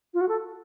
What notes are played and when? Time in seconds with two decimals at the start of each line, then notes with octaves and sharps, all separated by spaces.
0.14 F4
0.21 F#4
0.28 A4